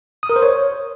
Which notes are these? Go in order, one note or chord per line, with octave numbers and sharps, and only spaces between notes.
D#6
A#4
C5
C#5